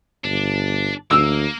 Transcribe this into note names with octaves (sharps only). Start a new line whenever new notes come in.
G1 D4
D2 A#3 E6